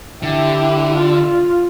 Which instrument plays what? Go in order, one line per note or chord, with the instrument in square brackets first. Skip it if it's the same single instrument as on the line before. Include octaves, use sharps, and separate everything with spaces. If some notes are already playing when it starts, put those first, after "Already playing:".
[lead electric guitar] D3 [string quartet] E4 G4
[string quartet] F4
F4